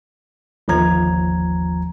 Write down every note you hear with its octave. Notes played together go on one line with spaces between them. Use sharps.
G1 D#2 F3 A#5 G#6